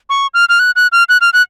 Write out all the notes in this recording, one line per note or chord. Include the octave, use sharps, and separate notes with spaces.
C#6
F6
F6
F#6
F#6
F6
F#6
F6
F#6